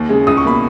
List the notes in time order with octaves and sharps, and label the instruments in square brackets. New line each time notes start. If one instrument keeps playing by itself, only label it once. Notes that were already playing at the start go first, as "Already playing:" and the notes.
Already playing: [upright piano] D#2
C#3 G#3
C#2 D#6
C#6
B2 A#3 B5